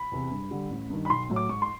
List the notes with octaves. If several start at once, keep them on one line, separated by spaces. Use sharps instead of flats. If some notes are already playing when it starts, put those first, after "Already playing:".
Already playing: B5
E2 C3
G2
D3 G3
A1
G2 D#3
B5
B1 C6
A2 F#3
D6
G#2 C#6
C6